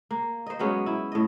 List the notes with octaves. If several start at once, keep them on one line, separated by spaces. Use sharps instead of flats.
A#3
C5 D#5
F#3 G#3 B3 C#4
E4
A2 D#5